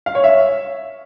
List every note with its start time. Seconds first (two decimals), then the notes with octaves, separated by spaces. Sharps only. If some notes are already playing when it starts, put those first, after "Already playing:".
0.06 F5
0.15 C#5
0.24 E5